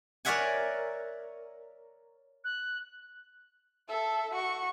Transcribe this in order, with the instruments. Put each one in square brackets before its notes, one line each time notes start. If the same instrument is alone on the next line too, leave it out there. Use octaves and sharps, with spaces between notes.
[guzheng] A#4 C#5 D5 E5 F#5 G#5
[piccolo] F#6
[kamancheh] A4 E5
F#4 C#6